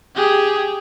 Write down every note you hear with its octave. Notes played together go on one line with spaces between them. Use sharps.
G4 G#4